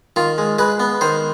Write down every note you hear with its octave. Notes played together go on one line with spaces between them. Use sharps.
D#3 F4
G#3
G#3 B4
B3
D#3 C5